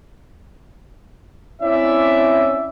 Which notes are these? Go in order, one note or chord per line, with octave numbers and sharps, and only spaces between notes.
C4 C#4 E4 D5 E5